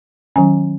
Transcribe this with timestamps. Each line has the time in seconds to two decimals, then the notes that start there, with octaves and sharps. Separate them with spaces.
0.36 D#3 F#3 C#4 G#5